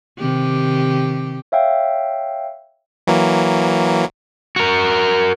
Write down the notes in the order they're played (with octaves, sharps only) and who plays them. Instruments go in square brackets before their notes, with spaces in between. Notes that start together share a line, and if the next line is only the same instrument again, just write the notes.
[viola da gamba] C3 D#3 G4
[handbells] C#5 E5 F5 G5
[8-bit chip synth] E3 F#3 A#3
[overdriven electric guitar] F#4 A#4